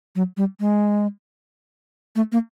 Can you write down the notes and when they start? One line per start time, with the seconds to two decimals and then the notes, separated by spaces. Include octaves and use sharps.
0.16 F#3
0.37 G3
0.60 G#3
2.16 A3
2.32 A#3